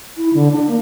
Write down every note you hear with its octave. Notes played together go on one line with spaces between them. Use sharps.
E4
D3
D4
A#3